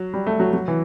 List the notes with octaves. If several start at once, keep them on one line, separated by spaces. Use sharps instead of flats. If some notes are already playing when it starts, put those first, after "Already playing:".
Already playing: F#3
G3
A3
F#3
F#3
E3